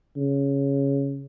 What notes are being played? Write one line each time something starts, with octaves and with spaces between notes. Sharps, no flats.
C#3